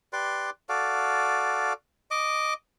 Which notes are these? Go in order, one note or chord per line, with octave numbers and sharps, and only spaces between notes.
G4 B4 D5 C6
F#4 A4 D5 F5
D#5 D6